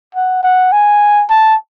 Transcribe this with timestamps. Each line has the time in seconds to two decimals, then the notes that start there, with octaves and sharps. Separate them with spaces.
0.15 F#5
0.43 F#5
0.72 G#5
1.30 A5